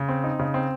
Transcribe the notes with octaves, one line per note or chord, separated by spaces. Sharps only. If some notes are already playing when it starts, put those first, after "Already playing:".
Already playing: C#3
C4
D#4
C#3
C4